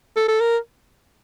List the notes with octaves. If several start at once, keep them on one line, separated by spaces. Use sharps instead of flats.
A4
A4
A#4